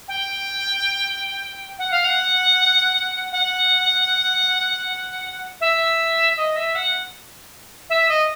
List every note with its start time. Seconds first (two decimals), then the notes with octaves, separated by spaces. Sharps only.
0.08 G5
1.79 F#5
1.91 F5
2.04 F#5
3.32 F#5
5.61 E5
6.36 D#5
6.56 E5
6.75 F#5
7.89 E5
8.09 D#5